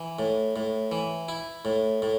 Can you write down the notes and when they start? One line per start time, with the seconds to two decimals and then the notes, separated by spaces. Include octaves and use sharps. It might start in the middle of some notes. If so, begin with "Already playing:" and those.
Already playing: E3
0.19 A2
0.56 A2
0.92 E3
1.28 E4
1.65 A2
2.02 A2